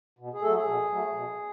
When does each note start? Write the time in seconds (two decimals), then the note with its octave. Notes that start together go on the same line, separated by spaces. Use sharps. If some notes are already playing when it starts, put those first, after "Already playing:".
0.19 B2
0.34 G#4
0.42 F#3 A3 A4
0.55 G#4
0.67 B2
0.90 F#3 A3
1.14 B2